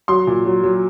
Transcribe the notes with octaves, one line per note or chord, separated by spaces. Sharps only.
F#3 C6
A#2
F#3
F#3